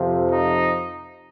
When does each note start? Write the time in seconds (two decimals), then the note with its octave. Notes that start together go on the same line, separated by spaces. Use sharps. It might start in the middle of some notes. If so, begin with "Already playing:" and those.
Already playing: F2 C3 F3
0.30 D#4